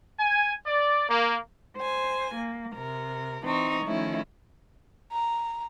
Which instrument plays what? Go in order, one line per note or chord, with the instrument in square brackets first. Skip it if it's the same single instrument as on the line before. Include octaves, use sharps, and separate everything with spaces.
[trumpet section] G#5
D5
A#3
[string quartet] C5 G#5
A#3
C3 A#4
E3 C4 D#4 C#6
D#3 F3 A3 C#4 E4
[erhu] A#5